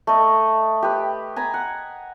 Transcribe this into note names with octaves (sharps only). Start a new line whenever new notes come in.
A3 D#5
G4 B4
G#5 A#5 B5
F#5